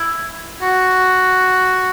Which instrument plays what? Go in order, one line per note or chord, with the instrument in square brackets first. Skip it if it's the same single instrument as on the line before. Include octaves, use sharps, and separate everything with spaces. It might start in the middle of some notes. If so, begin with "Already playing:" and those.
Already playing: [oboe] E4
F#4